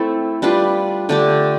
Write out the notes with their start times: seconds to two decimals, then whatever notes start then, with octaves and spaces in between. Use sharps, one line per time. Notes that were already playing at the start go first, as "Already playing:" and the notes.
Already playing: A3 C4 E4 A4
0.42 G3 D4 F4 B4
1.09 D3 A3 D4 G4